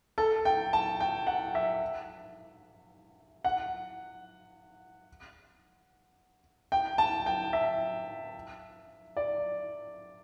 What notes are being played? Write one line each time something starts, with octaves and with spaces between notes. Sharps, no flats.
A4
G5
A5
G5
F#5
E5
F#5
G5
A5
G5
E5
D5